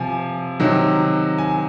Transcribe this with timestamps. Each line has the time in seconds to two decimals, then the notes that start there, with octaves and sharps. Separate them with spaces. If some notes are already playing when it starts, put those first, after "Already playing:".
Already playing: C3 F3 G#5
0.60 C3 D#3 F#3
1.38 G#5